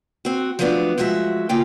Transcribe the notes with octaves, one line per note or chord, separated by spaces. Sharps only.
C4 F#4
F3 F#3 A3 B3 C#4 D4
F3 F#3 G#3 F#4 E5
C#3 A#3 F4 G5